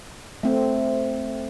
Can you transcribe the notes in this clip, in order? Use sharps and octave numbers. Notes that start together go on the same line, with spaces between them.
A3 C4